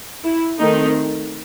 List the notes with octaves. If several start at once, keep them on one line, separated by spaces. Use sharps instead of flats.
E4
D#3 A3 C4 D#4